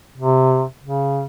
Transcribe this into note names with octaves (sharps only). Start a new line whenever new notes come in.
C3
C#3